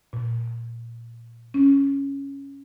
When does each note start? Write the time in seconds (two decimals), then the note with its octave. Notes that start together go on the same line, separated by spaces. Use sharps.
0.13 A#2
1.54 C#4